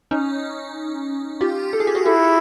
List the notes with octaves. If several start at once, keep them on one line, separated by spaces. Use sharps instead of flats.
C#4 D#4
F4 G4
A4
G#4
G4
F#4 G#4
E4 G4 A4